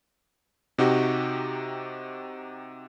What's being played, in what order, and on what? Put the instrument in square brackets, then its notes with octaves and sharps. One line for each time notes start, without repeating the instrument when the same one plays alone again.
[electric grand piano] C3 D#4 F#4 G4